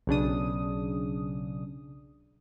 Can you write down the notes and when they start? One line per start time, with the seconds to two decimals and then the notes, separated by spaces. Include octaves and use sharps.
0.07 B1 C#3 D4 D#6